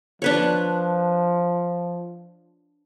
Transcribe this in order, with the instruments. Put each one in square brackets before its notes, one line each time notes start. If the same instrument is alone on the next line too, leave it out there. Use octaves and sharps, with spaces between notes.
[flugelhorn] F3 [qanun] D4 B4 C#5